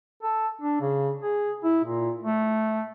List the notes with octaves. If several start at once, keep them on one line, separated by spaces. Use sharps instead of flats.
A4
D4
C#3
G#4
E4
A#2
A3